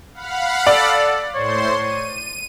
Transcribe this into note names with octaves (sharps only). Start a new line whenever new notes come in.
F5 F#5 B5
A4 D5
A2 C5 C#5 C6
D#7